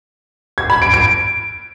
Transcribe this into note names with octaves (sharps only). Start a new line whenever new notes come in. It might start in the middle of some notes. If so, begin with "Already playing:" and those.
G#6
B5
D7
D7